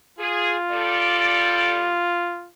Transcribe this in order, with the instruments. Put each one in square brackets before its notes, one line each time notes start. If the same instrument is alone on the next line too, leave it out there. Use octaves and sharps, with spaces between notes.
[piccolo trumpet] F4 [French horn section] G#4
[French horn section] G3 A4 D5